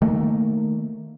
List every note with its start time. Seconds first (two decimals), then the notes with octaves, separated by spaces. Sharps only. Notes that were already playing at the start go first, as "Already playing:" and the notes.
0.02 D#3 A3 A#3